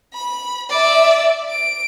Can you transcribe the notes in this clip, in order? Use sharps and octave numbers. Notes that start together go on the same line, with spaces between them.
B5
D5 E5
D7